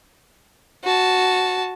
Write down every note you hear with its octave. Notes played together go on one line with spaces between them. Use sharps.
F#4 A5